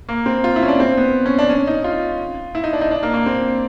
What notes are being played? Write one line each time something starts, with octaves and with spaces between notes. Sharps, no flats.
A#3
C4
F4
E4
C#4
D4
C4
B3
C#4
D4
C#4
D#4
F4
E4
D#4
D4
D#4
D4
A#3
A#3
C4